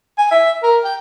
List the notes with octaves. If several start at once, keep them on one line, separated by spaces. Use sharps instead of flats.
G#5
E5
A#4
G5